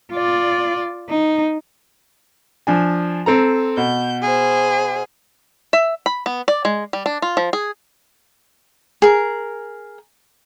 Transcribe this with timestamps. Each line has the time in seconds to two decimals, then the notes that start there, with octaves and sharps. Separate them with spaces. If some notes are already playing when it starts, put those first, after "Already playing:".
0.13 F4 D5
1.10 D#4
2.67 F3 D4 G#5
3.26 C4 A4 A#5
3.77 B2 G6
4.22 G#4 C5
5.73 E5
6.06 B5
6.26 B3
6.48 D5
6.65 G#3
6.93 G3
7.06 D4
7.22 F4
7.37 F3
7.53 G#4
9.02 G#4 A#4